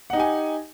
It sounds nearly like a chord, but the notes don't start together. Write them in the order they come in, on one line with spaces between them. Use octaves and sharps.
F#5 D#4 G4 G#5